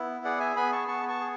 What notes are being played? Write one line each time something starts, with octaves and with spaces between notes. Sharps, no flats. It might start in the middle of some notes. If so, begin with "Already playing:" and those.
Already playing: B3 E4
G#4 D5 F#5
E5 G#5
B3 G#5 B5
A5 C#6
B3 A5 C#6
A5 C#6
G#4